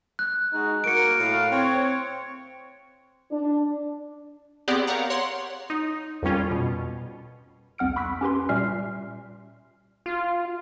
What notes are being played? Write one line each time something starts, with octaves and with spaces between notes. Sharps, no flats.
F#6
G#3 D#4 F#4
A#3 F#4 A#4 C#7 D7
A2 F5
C4 C#5
D4
B3 C4 G4 G#4 D5 F#5
A#4 C#5 F5 F#5 A#5
C#5 F#5 C6
D#4
F2 A#2 G3 C#4 F4
B2
C2 F2 F#5 F6 D7
B5 C#6 E6 F#6 B6
C#4 G4 B4 C6
A#2 G3 E5 G#5 F6 C7
F4